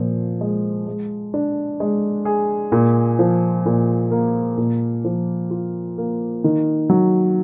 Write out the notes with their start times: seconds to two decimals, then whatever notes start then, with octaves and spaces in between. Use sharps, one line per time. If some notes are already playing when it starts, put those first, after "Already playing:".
Already playing: A#2 F3
0.41 G#3
0.87 G#3
1.34 D4
1.80 G#3
2.25 G#4
2.72 A#2
3.19 F3
3.66 A#2
4.11 A#3
4.57 A#2
5.05 F3
5.51 F4
5.98 A#3
6.44 D#3
6.90 F#3